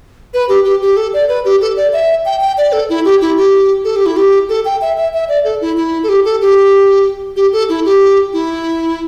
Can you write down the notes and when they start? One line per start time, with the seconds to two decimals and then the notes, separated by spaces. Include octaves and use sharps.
0.34 B4
0.49 G4
0.65 G4
0.82 G4
0.97 A4
1.14 D5
1.29 B4
1.45 G4
1.61 A4
1.77 D5
1.93 E5
2.25 G5
2.41 G5
2.58 D5
2.73 A4
2.89 E4
3.05 G4
3.21 E4
3.37 G4
3.85 A4
3.96 G4
4.06 E4
4.17 G4
4.49 A4
4.65 G5
4.81 E5
4.97 E5
5.13 E5
5.29 D5
5.44 A4
5.61 E4
5.76 E4
6.03 A4
6.09 G4
6.25 A4
6.41 G4
7.36 G4
7.53 A4
7.69 E4
7.85 G4
8.33 E4